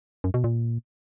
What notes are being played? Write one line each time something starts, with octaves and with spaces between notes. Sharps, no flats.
F#2
B2
A#2